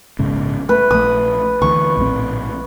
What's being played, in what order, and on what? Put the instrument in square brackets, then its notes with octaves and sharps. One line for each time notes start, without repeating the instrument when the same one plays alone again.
[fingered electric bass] A#1 G#2 C#3
[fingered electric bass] A3 [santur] B4
[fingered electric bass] A#1 A3 [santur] D#6
[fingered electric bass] D2 E3 [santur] C#6
[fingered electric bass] A#1 A2 C4